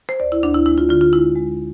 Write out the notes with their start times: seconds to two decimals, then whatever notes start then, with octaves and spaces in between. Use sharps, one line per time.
0.09 C5
0.20 D2 D5
0.32 E4
0.43 D2 D4
0.54 E4
0.66 G#3 E4
0.78 F4
0.89 D3 F4
1.01 F4
1.13 G#3 E4
1.36 G#3